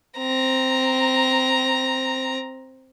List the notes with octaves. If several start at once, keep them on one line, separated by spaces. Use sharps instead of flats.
C4 A#5